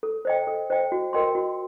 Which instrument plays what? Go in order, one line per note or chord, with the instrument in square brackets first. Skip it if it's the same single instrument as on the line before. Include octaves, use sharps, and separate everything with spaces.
[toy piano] A4
C5 D#5 G5
A4
C5 D#5 G5
F#4
A#4 D#5 G5 C6
F#4